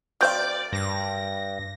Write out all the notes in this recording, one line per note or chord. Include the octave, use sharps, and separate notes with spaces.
F#3 C4 A#4 D5 F5 G6
G2 A#6